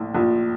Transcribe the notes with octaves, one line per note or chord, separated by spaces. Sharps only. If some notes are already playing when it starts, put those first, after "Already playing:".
Already playing: A#1 A2
A#1